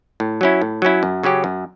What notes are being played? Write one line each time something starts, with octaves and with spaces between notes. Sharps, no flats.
A2
F#3 C#4 E4
A2
F#3 C#4 E4
F#2
C#3 F#3 C#4 G4
F#2